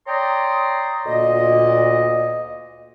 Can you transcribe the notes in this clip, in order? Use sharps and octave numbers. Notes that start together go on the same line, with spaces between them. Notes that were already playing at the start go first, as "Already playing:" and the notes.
C#5 D5 G5 A#5 C6 D#6
D2 A#2 A#3 D#5